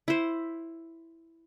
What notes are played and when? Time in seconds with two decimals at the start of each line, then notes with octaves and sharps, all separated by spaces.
0.08 E4 C5